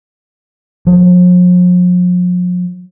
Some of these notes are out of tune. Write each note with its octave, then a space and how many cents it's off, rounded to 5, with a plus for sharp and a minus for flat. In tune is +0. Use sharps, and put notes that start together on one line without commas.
F3 +45